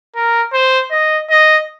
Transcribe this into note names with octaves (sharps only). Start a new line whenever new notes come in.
A#4
C5
D#5
D#5